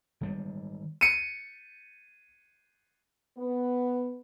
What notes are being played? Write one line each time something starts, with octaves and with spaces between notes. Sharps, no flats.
D#3 G3 G#3
C#7 D#7
B3